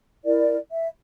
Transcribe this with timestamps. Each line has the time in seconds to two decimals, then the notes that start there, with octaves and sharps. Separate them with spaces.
0.24 E4 A#4 D5
0.71 E5